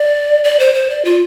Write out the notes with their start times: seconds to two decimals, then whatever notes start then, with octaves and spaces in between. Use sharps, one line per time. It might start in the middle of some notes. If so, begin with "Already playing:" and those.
Already playing: D5
0.44 D5
0.59 C5
0.74 C5
0.90 D5
1.05 F4